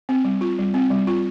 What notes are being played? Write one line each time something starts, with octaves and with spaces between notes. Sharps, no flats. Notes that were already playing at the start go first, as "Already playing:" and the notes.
C4
G3
F4
G3
C4
G3
F4